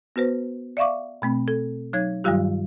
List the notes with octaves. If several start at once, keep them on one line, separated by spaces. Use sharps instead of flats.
B3 F#4 B4 C5
D5 E5 F5 C#6 D6
B2 A3 C4
A4
F#3 D#4 C#5 G#6
G2 D#3 F#3 G3 F4 G4